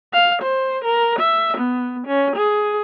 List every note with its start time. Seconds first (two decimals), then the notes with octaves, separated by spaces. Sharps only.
0.13 F5
0.43 C5
0.85 A#4
1.19 E5
1.58 B3
2.07 C#4
2.37 G#4